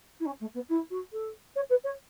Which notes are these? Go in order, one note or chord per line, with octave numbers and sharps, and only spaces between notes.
E4
C#4
A3
B3
E4
F#4
A4
C#5
B4
C#5